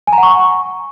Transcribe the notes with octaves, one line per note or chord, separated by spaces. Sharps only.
G#5
A#5
F#5
C#6